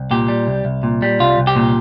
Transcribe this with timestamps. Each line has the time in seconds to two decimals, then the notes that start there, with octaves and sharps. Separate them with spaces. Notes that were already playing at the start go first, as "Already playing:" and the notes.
Already playing: C2
0.11 A#2 G4
0.28 G3
0.47 C2
0.65 C2
0.83 A#2
1.02 G3
1.20 C2 F4
1.38 C2
1.47 G4
1.56 A#2